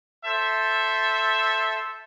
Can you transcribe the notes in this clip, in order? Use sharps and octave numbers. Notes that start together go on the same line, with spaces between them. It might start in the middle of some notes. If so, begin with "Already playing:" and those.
A4 C5 E5